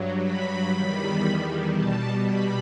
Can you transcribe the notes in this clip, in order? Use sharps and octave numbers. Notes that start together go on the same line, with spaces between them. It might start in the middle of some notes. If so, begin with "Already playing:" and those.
Already playing: G2 F#3
B5
E2 D#3 G3
B2 G3 A5
B5